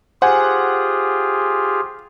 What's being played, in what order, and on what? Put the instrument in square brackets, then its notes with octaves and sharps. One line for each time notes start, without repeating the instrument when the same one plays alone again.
[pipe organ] F4 G4 G#4 [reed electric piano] C5 G#5 [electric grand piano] F#5